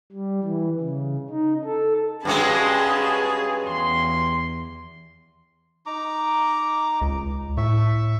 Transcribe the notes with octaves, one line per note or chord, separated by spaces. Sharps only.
G3
E3
C#3
D#4
A4
G2 F#3 G#3 C#4 G#4 B4 A5
E2 C6
D#4 A#5 D6
C#2
A2 E5 C#6